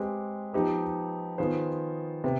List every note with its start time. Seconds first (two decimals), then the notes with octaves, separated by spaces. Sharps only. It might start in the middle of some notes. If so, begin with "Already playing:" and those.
Already playing: G#3 C4 G4 B4
0.53 F3 B3 D#4 G4 B4
1.38 D#3 B3 F4 G#4 C5
2.24 C3 B3